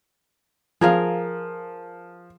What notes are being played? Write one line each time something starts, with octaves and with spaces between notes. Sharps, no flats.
F3 G#4 A#4 F5